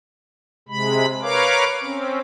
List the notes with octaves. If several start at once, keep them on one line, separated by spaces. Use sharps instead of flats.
C3 G#3 B5
A#4 B4 C#5 F5 D6
C4 C#4